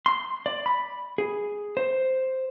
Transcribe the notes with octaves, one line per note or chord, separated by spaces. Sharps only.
C6
D5
B5
G#4
C5